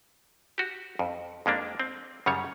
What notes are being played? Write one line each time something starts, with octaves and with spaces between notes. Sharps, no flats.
F#4 G4
F2
F2 G#3 A#3 D4
C4
F#2 C#3 G3 C#5